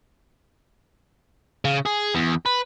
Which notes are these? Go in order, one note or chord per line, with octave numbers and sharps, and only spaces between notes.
C#3
G#4
E2
B4